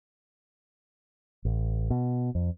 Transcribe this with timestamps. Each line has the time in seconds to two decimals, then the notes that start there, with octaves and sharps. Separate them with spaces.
1.45 A1
1.90 B2
2.35 F2